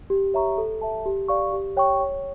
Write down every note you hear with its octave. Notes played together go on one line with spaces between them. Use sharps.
G4
C#5 E5 A#5 C#6
A4
E5 A5
G4
D5 F5 C#6
G4
C#5 G5 C#6
C#5